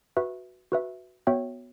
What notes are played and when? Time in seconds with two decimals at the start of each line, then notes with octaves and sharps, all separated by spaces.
0.17 F#4 B4 E5
0.72 F#4 B4 E5
1.27 B3 F#4 C#5 E5 G5